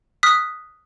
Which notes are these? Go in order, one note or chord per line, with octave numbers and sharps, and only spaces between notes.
D#6 F6 F#6 B6